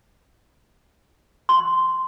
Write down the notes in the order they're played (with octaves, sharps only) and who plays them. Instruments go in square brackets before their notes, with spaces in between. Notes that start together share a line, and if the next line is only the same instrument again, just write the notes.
[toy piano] C6